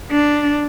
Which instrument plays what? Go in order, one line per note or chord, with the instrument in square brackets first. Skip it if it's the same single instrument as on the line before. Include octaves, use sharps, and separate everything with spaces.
[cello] D4